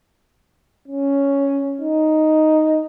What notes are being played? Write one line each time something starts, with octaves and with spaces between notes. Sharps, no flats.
C#4
D#4